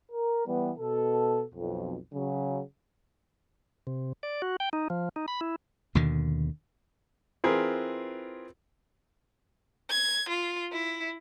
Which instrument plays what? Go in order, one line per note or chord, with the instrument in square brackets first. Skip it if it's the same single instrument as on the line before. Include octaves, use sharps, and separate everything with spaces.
[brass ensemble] A#4
E3 G3 B3
B2 A4
B1 F2
C#3 F#3
[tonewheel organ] C3
D5
F#4
G5
D#4
F3
D#4
B5
E4
[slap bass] D#2 B2 D3 D#3
[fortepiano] E3 C4 F4 G#4 A#4 B4
[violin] G#6
F4
E4